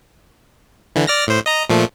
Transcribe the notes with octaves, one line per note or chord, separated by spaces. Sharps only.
D3 E3
D5 F6 A#6
A2 C5
D#5 A#5
A#2 F3 A3